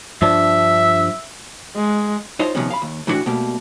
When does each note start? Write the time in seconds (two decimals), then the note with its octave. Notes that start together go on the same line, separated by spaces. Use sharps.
0.22 G2 F3 D4 E5
1.75 G#3
2.39 D#4 F4 C5 C#5 D#5
2.55 C3 D#3 F3 G3 B3 C#4
2.70 F5 B5
2.82 D#2
3.07 A2 E3 G3 D4 F#4
3.26 B2 G3 A3 A#3